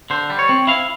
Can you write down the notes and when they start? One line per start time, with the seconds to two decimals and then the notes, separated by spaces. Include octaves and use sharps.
0.10 D3 C5
0.30 G3
0.39 C#5
0.49 C4
0.67 E4 F5